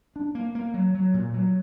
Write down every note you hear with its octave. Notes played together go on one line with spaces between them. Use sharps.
D4
A#3
A#3
F#3
F#3
A#2
F#3